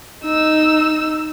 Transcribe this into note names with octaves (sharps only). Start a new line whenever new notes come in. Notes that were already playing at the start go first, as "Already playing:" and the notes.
D#4 E6